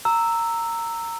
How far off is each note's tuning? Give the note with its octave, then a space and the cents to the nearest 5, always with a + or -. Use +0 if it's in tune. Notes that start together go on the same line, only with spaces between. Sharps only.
A#5 -15 E6 +0